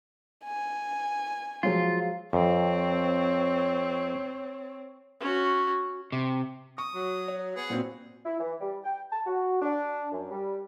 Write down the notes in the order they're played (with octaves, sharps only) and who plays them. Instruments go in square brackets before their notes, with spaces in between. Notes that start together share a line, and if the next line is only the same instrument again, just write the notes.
[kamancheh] G#5
[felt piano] F3 F#3 G#3 [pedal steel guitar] F4
[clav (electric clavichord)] F2 [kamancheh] C4 C#5
[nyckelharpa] C#4 F#4
[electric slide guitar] C3
[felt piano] C#6 [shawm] D#6
[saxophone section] F#3
[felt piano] C#5
[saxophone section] B3 [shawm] G#4
[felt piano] A#2 C4 F#4
[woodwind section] E4
E3
G3
G5
A5
F#4
D4
F#2
G3